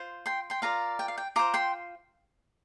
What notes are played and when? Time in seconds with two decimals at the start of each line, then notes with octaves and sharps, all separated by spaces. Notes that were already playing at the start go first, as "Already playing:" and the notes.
Already playing: F4 C5
0.26 G5 C6
0.50 G5 C6
0.62 F4 A#4 D5 F5 A#5
0.99 G5
1.08 F5
1.18 G5
1.36 F4 C5 A#5 D6
1.54 G5 C6